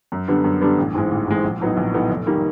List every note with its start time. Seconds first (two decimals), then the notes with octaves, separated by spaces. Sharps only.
0.12 F#2
0.28 D3 G3 B3 D4
0.44 F#2
0.61 D3 G3 B3 D4
0.78 A1
0.94 G#2 E3 G#3 C4
1.11 A1
1.28 G#2 E3 G#3 C4
1.44 A#1
1.60 A2 F#3 B3 D#4
1.77 A#1
1.94 A2 F#3 B3 D#4
2.09 F1
2.27 D#3 G3 A#3